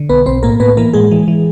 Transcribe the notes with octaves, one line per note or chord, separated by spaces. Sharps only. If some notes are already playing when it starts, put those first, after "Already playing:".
Already playing: D3
B1 B3 B4
B1 C4 C5
A2 A#3 A#4
A2 B3 B4
E3 A#3 A#4
A2 G#3 G#4
E3
E3